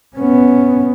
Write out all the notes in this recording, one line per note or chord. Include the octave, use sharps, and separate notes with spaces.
B3 C#4